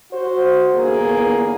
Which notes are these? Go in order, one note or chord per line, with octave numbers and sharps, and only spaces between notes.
F#4 C5
G1 E2 A#3 G#4